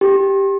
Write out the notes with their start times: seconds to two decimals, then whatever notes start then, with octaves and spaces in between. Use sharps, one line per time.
0.01 G4